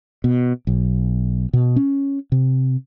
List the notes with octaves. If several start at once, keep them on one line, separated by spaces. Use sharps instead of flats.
B2
B1
B2
C#4
C3